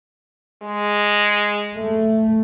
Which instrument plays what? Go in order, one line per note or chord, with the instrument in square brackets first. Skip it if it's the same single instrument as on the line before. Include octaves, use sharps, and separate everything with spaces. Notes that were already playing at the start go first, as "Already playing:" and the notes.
[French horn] G#3
[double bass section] A3